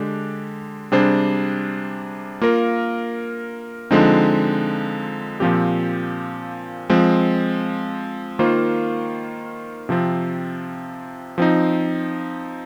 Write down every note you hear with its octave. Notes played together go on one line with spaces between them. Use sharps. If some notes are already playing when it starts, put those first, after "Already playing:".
Already playing: D3 G#3 D4 G4
C3 G3 D4 G#4 C5
A#3 F4 A#4
D3 F3 G#3 C4 D#4
A#2 F3 C4 G4
F3 G#3 C4
D#3 A#3 F4 C5
C3 F3 C4
F3 C4 D#4